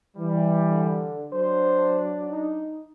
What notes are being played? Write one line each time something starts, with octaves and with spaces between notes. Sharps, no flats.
E3 G3
D3
F#3 D4 C5
D#4